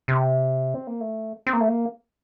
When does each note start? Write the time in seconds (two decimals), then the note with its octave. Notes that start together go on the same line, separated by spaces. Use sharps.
0.08 C3
0.74 C4
0.87 A#3
1.01 A3
1.47 C4
1.53 A#3
1.61 A3
1.68 A#3